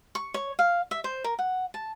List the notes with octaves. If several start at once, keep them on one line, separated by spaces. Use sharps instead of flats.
C#6
C#5
F5
E5
C5
A#4
F#5
A5